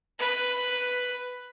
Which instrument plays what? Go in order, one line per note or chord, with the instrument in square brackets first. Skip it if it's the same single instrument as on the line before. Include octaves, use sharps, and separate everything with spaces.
[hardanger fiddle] B4